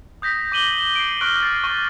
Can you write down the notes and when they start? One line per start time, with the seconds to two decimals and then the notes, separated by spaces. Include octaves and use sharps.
0.22 D#6 G6 A#6 B6
0.52 D6 A#6 D#7 F#7 G7
0.96 C7 D7
1.21 C#6 F6 F#6 A#6 D7
1.43 A6 C7
1.64 C#6